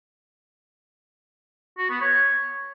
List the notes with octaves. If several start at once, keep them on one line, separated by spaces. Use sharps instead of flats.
F#4
B3
C#5